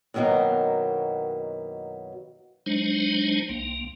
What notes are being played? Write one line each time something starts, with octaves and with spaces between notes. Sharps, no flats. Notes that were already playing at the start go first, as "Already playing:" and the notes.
F#2 B2 D#3 F#3 A#3 E4
F#3 G#3 D4 D#4 C5
C2 A#3